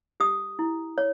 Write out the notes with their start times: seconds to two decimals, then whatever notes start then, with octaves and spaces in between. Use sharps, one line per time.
0.20 G4 D#6
0.59 E4
0.98 C#5